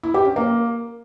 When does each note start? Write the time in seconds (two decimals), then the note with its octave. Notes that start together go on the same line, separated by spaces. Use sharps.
0.03 E4
0.14 G4
0.25 C#4
0.36 A#3